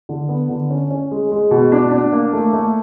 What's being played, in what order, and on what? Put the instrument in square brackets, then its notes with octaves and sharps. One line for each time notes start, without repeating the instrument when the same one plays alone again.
[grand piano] D3
B3
D3
C#4
C#4
G#3
G#3
B2
D4
D4
A#3
A3
A3